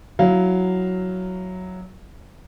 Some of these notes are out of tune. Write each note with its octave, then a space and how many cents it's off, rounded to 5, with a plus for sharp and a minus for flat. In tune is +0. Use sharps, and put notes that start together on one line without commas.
F#3 +0 E4 +0 F5 +0